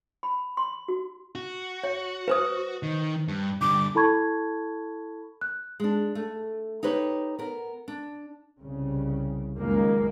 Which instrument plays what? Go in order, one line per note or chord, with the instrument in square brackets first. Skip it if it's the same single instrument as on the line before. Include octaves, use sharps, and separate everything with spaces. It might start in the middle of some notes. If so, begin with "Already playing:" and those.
[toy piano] B5
C6
F#4
[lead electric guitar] F#4
[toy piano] C#5
B4 C5 D#6
[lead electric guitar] D#3
G2
[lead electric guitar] G2 D3 [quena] D6
[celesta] E4 A4 A5 B5 C#6 G#6
F#6
[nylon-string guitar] G#3 D4
A3
D#4 G4 B4 C#5
B3 A#4
D4
[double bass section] C2 C#3
C#2 F#2 D#3 G#3 A#3